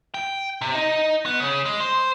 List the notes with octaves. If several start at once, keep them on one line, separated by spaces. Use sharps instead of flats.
G5
C3
D#4
B3
C#3
G#3
C5